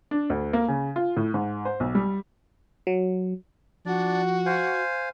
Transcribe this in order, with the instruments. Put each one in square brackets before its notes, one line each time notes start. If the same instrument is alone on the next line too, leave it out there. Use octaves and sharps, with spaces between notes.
[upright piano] D4
D2
A#3
C#3
F4
A2
G#2
C5
B1
G3
[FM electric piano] F#3
[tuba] F3 [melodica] D4 D5 [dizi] F#4
[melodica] C5 F5 G#5